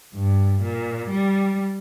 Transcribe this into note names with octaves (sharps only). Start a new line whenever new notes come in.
G2
A#2
G3